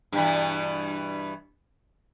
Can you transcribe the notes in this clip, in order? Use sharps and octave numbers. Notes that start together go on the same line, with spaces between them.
G2 B2 E3